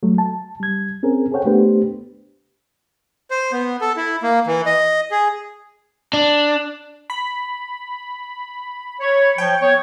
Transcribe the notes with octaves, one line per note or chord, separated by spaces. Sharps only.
F#3 A3
A5
G3 G#6
C4 C#4 G#4 A#4
G#4 A4 C5 C#5 F#5 G5
A3 B3 D4 G4 B4 C5
C5
B3
A4
E4
A#3
E3
D#5
G#4
D4
B5
C#5
F3 C#5 G5
B3 C#5